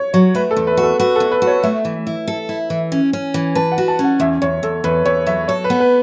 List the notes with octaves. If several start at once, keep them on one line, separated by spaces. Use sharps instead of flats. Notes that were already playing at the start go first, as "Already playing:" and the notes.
Already playing: C#5
F#3 C#5
A3 B4
A4
E2
B4
F#4
A4
F#4 B4
A4
E2
B4
F#4
C#5
A3 E5
E3
E4
A4
E4
E3
C#4
C#4
E3
B4 A5
F#5
F#4
A5
C#4
F#5
E2 E5
E2 C#5
E2 A4
E2 B4
E2 C#5
F#3 E5
A4 C#5
B4
B3
B4